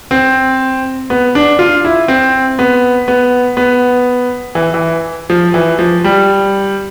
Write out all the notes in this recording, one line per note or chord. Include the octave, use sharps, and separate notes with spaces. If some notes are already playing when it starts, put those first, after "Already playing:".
C4
B3
D4
F4
E4
C4
B3
B3
B3
E3
E3
F3
E3
F3
G3